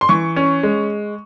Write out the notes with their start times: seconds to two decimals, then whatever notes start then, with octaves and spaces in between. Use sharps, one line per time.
0.01 C6
0.09 E3 C#6
0.36 C#4
0.63 G#3